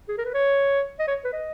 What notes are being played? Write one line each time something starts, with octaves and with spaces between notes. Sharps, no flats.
G#4
A#4
B4
C#5
D#5
C#5
B4
D#5